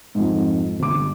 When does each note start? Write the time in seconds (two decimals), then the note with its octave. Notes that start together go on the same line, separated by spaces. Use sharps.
0.15 F2 G#2
0.80 G1 D6